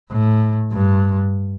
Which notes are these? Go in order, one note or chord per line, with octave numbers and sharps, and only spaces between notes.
A2
G2